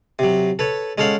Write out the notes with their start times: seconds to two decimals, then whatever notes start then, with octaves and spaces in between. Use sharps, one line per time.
0.19 C3 F#3
0.59 A4 B4 C#5
0.98 G#3 C#4 A4 C#5 F5 F#5